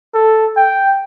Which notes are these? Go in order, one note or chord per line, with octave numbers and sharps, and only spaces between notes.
A4
G5